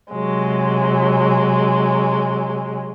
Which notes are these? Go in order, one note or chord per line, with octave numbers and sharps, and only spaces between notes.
C3 F#3 G#3